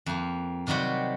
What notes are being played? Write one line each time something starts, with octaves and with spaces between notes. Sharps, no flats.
F2 A#3
C3 D#3 F#3 G3 F#4